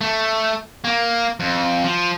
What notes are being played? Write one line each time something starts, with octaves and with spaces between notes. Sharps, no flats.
A3
A#3
F2
F3